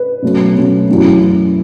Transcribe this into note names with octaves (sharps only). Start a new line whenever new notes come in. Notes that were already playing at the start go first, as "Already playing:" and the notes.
Already playing: B4
B2 F#3 A3 C#4
B2 F#3 A3 C#4
F#2 E3 A3